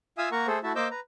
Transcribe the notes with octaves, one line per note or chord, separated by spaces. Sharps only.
F4 E5 F5 G#5 D#6 E6
A#3 A#4 F#5 A#5 C#6
A3 G#4 A4 C5
A3 E4 F#4 E5 A5
A#3 C5 D#5 D6 E6 G6
B4 A#5